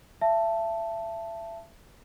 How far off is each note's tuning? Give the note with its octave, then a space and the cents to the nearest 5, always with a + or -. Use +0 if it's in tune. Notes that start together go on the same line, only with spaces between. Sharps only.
E5 +30 A5 +0